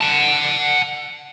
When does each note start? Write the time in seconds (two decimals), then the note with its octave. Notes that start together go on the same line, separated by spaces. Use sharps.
0.01 F#5 A5